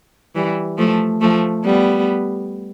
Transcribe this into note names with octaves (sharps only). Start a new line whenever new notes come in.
E3 G3
F3 A3
F3 A3
G3 B3